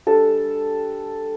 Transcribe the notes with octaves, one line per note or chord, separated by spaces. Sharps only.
G3 D4 A4